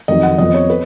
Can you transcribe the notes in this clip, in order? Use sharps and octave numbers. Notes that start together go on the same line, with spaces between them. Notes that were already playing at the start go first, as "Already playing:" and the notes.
F2 D#3 F#3 D#5
F#5
F2 F3 B3 D#5
C#5
B4